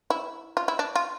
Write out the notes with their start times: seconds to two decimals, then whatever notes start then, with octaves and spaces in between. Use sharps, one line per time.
0.10 E4
0.57 F4
0.68 E4
0.79 D4
0.96 F4